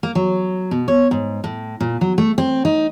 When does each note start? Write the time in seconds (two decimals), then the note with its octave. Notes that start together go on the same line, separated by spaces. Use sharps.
0.03 A#3
0.15 F#3
0.71 B2
0.88 C#5
1.11 G#2
1.44 A2
1.81 A#2
2.01 F#3
2.18 A3
2.38 C4
2.65 D#4